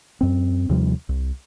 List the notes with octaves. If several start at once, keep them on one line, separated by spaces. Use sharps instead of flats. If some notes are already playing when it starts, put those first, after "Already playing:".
F#2 C4
D#2 C3 F3 G3
C2